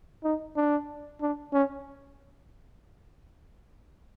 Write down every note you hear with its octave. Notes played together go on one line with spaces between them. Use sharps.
D#4
D4
D4
C#4